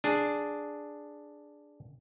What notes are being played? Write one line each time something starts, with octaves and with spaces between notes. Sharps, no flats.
D4 G#4